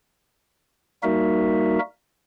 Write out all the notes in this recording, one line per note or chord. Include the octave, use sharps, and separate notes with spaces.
G3 A#3 D#4 F#4 A#4 E5